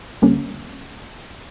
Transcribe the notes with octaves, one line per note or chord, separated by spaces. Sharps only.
D2 D3 G3 A#3 C#4